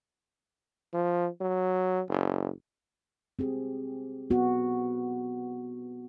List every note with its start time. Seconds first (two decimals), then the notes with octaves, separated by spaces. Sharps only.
0.94 F3
1.41 F#3
2.09 F#1
3.39 C4 G4 G#4
4.30 B3 F#4